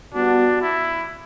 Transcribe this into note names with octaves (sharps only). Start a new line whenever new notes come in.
G3 B3 D4 F#4
E4